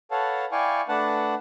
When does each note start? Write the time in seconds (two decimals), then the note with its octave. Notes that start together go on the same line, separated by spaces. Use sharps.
0.11 A4 B4 C#5 F5 F#5 A5
0.52 E4 D5 F5 G5 G#5 C#6
0.89 A3 D4 B4 F#5 A5